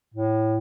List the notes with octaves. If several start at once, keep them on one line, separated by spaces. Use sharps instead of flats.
A2